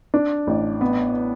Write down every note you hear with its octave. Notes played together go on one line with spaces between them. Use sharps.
D4
A1
B3